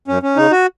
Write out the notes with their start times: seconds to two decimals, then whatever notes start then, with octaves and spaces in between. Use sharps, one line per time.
0.08 F#2 C#4
0.23 C#4
0.37 C#3 D#4
0.51 F#4